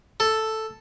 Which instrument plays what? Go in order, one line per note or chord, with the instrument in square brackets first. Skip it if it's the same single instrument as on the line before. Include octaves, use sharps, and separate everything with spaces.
[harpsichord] A4